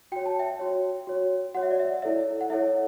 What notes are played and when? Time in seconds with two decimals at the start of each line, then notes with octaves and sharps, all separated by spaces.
0.12 F#4 C#5 G5
0.26 A5
0.39 E5 G5
0.59 F#4 C#5
1.07 F#4 C#5
1.55 F#4 C#5 F#5
1.63 E5
1.71 D5
1.79 E5
2.02 E4 A4 C#5 E5
2.41 F#5
2.50 E4 A4 C#5 E5